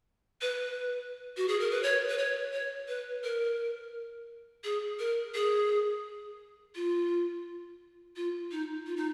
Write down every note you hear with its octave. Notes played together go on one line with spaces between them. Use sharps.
B4
F#4
G#4
A#4
B4
C#5
B4
C#5
C#5
B4
A#4
G#4
A#4
G#4
F4
F4
D#4
F4
D#4